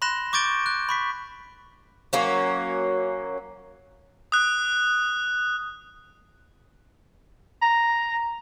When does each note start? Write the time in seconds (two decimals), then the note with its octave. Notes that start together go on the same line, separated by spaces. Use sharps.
0.02 B5 C6 F#6 A#6 E7
0.33 C#6 D6 G6 A6 D7 G7
0.66 F#6
0.89 B5 C#6 B6
2.13 F#3 A#3 C#4
4.32 D#6 F#6
7.62 A#5